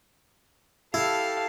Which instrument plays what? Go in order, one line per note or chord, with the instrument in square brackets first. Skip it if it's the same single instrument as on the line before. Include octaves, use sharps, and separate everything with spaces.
[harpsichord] E4 [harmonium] G4 A4 A5 [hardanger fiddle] F5